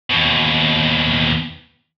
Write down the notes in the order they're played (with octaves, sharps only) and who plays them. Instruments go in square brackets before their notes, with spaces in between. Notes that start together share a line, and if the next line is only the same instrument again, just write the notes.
[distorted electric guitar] D#2 B2